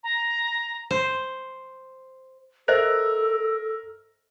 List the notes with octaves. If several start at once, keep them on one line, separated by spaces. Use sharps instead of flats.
A#5
C5
A4 A#4 C5 D#5 E5